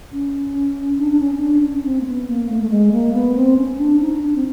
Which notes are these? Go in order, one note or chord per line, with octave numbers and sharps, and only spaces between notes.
C#4
D4
D4
C#4
C#4
D4
C#4
C4
A#3
B3
A#3
A3
A3
G#3
A#3
B3
C4
C#4
D4
D#4
D4
C4